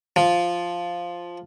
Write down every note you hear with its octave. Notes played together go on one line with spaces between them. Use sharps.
F3